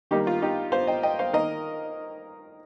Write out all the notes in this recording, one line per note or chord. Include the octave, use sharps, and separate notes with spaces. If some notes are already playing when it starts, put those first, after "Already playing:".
D#3 G3 A#3 D#4 G4
F4
D#4 G4
C5 F5
D#5 G5
D#5 G5
C5 F5
D#3 A#3 A#4 D#5